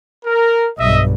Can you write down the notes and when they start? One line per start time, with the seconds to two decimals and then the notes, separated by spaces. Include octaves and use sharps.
0.25 A#4
0.79 B1 G2 D#5 E5